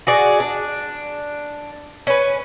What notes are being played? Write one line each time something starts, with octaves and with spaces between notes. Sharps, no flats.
F#4 G#4 D5
D4
C#4 B4